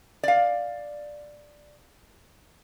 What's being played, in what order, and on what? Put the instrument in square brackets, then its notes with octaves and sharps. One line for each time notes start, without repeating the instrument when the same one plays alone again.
[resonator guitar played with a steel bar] D5 F5